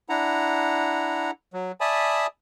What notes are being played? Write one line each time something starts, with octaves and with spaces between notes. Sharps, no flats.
D4 E4 F#5 A#5
F#3
D5 E5 G#5 A5 B5 D#6